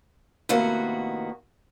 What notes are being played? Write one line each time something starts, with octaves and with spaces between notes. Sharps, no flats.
A2 C3 D#3 A#3 B3 F#4